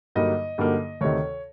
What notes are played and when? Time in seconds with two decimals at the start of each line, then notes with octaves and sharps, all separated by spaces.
0.16 G2 D3 F#3 A#3 D#4 D#5
0.58 G2 D3 F#3 A#3 D#4
1.01 D2 C3 D#3 C#5